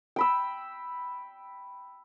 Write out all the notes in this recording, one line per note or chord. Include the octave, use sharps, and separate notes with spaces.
G5 B5 E6